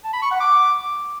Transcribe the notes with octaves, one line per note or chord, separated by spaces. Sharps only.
A5
B5
C#6
F#5
D6